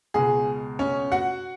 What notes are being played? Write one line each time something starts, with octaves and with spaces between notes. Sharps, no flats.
C#2 B2 G#3 G#4
C#4 C#5
F#4 F#5